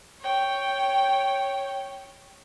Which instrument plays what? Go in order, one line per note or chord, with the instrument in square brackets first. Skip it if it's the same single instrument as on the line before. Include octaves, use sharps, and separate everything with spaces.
[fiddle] C#5 G5